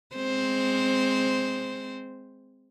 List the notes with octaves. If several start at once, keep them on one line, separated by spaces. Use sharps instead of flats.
G#3 C4 C5